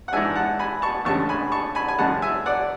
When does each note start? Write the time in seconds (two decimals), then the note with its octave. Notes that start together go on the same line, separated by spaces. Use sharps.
0.08 F#5
0.12 G#2 E3 G#3 D4 E5 G#5
0.35 F#5 A5
0.59 G#5 B5
0.82 A5 C#6
1.05 D2 C#3 G#3 A5 C#6
1.29 G#5 B5
1.52 A5 C#6
1.75 G#5 B5
1.88 G#5
1.99 F#2 C#3 G#3 F#5 A5
2.22 E5 G#5
2.46 D5 F#5